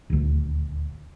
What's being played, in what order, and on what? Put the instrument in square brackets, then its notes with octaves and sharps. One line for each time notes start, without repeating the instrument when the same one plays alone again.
[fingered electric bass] D#1 D2